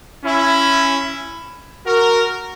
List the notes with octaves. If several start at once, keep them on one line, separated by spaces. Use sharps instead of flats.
C#4 E4
F#4 A#4